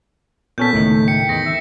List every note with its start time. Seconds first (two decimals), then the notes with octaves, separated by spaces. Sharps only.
0.58 A#2 B3 C#4 A4 G6 B6
0.73 C#2 A2 D#3 A3
1.08 G5 C#7
1.29 E2 D#3 A#6
1.46 E5